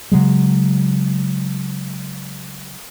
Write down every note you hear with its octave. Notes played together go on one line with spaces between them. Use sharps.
C#3 F#3 G#3